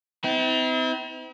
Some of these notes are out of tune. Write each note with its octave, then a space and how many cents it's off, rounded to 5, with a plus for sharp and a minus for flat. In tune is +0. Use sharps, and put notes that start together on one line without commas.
C4 -35 E4 -45